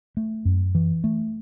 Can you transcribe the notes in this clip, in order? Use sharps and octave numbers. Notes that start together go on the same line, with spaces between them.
A3
F#2
E3
A3